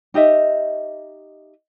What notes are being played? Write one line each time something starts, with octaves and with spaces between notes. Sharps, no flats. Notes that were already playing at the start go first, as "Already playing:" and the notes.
D#4 G4 D#5 E5